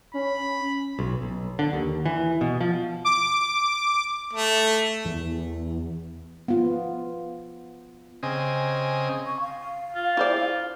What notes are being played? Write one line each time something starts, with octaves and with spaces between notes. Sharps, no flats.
C#4 B5
B1
B1
D3
D#2
E3
B2
F3
D6
A3
E2
B3 F4
C#3 C4 D#5 G#5
C#6
F5
F4
E4 C5 D5